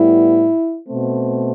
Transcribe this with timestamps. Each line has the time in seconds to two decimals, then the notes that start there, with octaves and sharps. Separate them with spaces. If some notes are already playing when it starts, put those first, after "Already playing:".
Already playing: A2 G3 B3 E4
0.87 B2 A3 C4